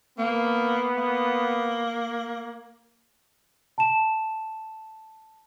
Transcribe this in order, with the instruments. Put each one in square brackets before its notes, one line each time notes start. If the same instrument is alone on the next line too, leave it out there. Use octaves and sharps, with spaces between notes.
[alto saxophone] A#3 [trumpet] B3
[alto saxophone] A#3
[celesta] A5 E7